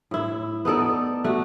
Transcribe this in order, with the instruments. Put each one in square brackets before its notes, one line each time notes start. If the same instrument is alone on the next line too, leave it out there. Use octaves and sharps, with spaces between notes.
[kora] A2 E4
B3 D#4 A4 D5
A3 F#4